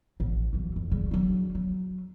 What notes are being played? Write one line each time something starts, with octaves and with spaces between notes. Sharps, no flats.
A1
E3 F#3
F2
C#3 G3
F#3 D4
F#3